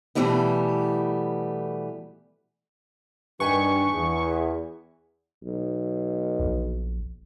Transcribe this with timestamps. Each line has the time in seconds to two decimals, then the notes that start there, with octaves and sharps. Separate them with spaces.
0.15 B2 D3 E3 G3 A3 B3
3.40 G2 D#3 D4 B4 G5 G#5 C#6
3.93 E2 G#4
5.44 B1
6.40 A#1